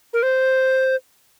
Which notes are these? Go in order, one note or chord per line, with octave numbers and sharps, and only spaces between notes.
A#4
C5